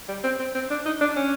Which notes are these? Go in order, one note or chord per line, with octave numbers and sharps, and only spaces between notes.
G3
C4
C4
C4
D4
D#4
D4
C#4